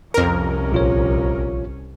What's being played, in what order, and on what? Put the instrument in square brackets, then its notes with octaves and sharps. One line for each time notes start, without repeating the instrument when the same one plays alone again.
[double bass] C2 C#4 [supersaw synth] F2 A#4
[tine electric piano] A#1 F4 C#5